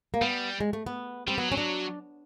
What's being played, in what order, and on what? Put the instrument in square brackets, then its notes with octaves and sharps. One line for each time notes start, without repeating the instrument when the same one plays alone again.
[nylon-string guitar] A#3
[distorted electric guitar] G3 [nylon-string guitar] B3
[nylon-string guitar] G#3
A3
B3
[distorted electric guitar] G3 [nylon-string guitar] C4
[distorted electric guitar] F#3 [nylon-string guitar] B3
[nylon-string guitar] C#4
D4